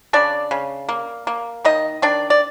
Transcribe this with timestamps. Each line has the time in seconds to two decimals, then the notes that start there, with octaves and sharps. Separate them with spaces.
0.13 C#3 D4 D5
0.51 C#3
0.89 A#3
1.27 A#3
1.65 D#3 D#4 D#5
2.02 D#3 D4 D5
2.30 D5